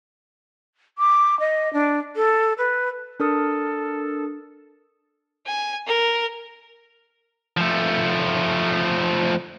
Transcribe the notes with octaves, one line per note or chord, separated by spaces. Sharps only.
D6
D#5
D4
A4
B4
D4 A4 A#4 D#6
G#5
A#4
F3 A3